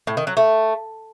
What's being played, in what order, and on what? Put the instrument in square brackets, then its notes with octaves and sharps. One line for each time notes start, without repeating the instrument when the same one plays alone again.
[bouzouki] A2
D#3
F#3
A3